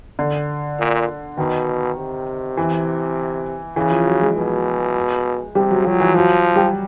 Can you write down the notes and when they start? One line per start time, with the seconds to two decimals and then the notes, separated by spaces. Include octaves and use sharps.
0.19 D3
0.79 A#2
1.37 B2 D#3
1.98 C3
2.57 E3
3.76 C#3 E3
3.91 F3
4.07 F#3
4.22 G#3
4.37 B2
5.55 C3 G3
5.70 F#3
5.86 F3 F#3
6.00 E3
6.15 F3 F#3
6.56 G3